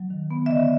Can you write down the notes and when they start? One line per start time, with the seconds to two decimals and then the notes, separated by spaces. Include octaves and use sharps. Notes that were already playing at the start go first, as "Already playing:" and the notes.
Already playing: F#3
0.10 D#3
0.31 B3
0.46 E5
0.50 D3 D#5